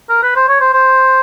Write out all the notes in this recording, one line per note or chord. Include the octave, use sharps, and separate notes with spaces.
A#4
B4
C5
C#5
C5
C5